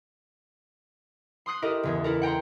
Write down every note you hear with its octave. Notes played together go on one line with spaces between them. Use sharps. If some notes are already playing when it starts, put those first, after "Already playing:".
C6 D#6 F#6 C7
E4 G4 A4 A#4 D#5
F#1 E2
E4 A4 A#4
F#5 G5 A#5 C6